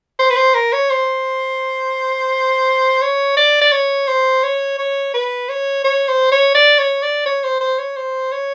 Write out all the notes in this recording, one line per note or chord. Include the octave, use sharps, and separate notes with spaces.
C5
B4
C5
A#4
C#5
C5
C#5
D5
D5
C#5
C5
C#5
C#5
B4
C#5
C#5
C5
C#5
D5
C#5
D5
C#5
C5
C5
C#5
C5
C#5